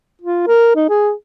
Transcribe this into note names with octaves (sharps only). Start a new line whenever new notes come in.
F4
A#4
D#4
G#4